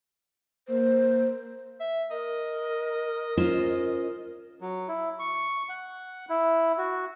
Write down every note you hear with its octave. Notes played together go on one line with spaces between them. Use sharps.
A#3 C5
E5
A#4 D#5
C#4 F4 C5
F#3
E4
C#6
F#5
E4
F#4